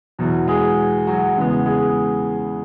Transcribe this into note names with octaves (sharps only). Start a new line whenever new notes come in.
E2 B2 F#3
G#3 G#4
F#3 F#4
E2 C#3 G#3 B3
G#3 G#4